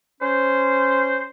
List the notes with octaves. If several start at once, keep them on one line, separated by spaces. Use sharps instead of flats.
C#4 C5